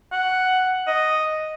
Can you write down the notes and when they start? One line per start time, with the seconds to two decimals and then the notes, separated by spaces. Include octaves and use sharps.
0.12 F#5
0.87 D#5